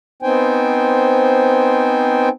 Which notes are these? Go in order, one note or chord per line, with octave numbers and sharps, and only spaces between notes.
B3 C4 D#4 C5 G5 G#5